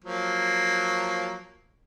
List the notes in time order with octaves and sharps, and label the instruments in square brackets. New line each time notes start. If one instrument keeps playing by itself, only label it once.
[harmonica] F3 F#3 A#3